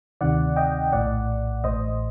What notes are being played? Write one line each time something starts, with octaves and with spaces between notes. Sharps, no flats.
D2 C3 D#3 D5 F#5
D#5 G5
A#1 A2 D5 F#5
A1 A2 C5 D#5